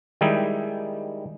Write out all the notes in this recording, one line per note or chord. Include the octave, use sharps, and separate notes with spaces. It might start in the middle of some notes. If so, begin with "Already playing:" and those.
D#3 G3 G#3 D#4 E4